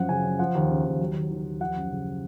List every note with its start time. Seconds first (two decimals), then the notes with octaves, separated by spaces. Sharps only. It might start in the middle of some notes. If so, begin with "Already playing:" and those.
Already playing: F#2 F3 F#5
0.09 C#3 G#5
0.24 F#2
0.39 F3 F#5
0.55 D#2
0.69 C#3
0.85 D#2
1.00 F#3
1.15 D#2
1.31 D#3
1.45 D#2
1.60 F3 F#5
1.76 F#2
1.91 C#3